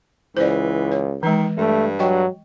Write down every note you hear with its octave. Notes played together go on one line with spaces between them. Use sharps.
C#2 E3 C5 D5
C#5
D#3 E3 G#3
G2 A3
F#3 D#5 G5 C#6